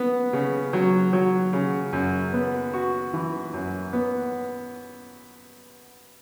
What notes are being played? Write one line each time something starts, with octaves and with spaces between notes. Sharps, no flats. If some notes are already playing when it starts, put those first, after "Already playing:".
Already playing: B3
C#3
F#3
F#3
C#3
F#2
B3
F#4
E3
F#2
B3